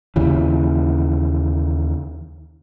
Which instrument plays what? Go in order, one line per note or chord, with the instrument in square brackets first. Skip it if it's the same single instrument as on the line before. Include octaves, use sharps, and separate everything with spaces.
[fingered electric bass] D#2 C#3 E3